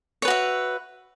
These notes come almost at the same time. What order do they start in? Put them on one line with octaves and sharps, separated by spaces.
C#5 B4 F#4 E5